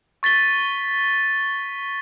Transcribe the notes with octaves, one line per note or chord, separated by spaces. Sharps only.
C#6 A6 B6 G7